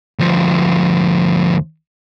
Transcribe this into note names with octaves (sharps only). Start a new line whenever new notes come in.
D2 F3